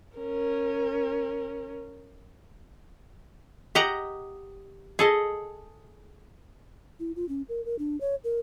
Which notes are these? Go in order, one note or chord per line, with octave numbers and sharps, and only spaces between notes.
C#4 A#4
G4 D#5 F#5 A#5
G#4 A4 D#5
E4
F4
C#4
A#4
A#4
D4
C#5
A#4